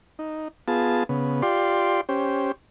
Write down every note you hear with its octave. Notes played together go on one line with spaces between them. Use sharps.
D#4
B3 F4 G#4 A5
C#3 B3
F4 G4 D5 C6
C#4 G4 C5